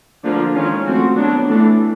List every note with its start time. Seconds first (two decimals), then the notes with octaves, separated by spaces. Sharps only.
0.24 D3 F3 A#3 D4 F4
0.55 D#3 G#3 C#4 F4
0.85 F3 A3 C4 F#4
1.16 F#3 B3 D4
1.46 E3 A3 D4